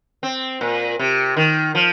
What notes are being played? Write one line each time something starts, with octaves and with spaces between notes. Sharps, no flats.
C4
A#2
C3
D#3
F3